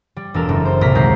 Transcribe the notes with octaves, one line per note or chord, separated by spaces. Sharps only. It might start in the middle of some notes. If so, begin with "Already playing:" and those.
G3
E1 A4 A#4
F#1
C5
C2 A#2 A#5 F6 B6
D#2 F#3 G#3 G6 C7